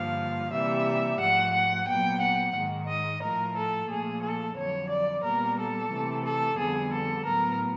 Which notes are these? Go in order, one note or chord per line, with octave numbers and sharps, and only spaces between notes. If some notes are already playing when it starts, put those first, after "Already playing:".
Already playing: G2 D3 F3 A#3 F5
C3 E3 G3 A#3 E5
G#2 F3 A3 F#5
F#5
A#2 F#3 B3 G5
F#5
G#2 D#3 G#3
D#5
A2 F3 A3 A#4
A4
A#2 F3 A3 G#4
A4
F2 D3 F#3 C#5
D5
A#2 G3 B3 A#4
A4
C3 E3 A3
A4
F2 D3 G3 B3 G#4
A4
A2 F#3 B3 A#4